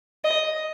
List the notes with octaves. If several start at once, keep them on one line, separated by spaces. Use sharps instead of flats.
D#5